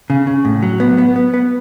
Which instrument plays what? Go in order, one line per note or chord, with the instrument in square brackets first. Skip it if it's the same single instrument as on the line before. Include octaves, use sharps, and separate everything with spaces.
[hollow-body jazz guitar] C#3
C#3
A2
F#3
B3
B3
B3
B3